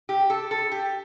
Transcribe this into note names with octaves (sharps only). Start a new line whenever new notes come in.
G4
A4
A4
G4